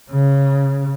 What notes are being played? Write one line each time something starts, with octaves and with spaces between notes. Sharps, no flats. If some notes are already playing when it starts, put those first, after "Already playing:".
C#3